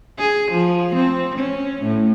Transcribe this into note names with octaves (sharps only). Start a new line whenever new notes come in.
G#4
F3
C4
C#4
A2